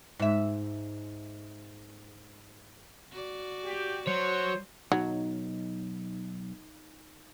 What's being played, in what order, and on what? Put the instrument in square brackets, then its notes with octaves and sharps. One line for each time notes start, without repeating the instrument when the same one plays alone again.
[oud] G#2 E5
[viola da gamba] F#4 D5
[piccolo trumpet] G4
[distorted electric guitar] F#3 [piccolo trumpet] C5 [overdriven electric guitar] C#5
[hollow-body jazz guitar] B1 [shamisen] F#3 [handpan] D#4